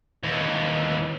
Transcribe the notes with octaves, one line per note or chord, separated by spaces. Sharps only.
D#2 E3